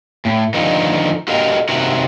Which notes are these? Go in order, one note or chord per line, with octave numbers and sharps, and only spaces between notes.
A2
D3 D#3 F3 D#4
F#4 G4 A4 A#4 D#5 F5
C3 D#4 F#4 A#4 E5 F#5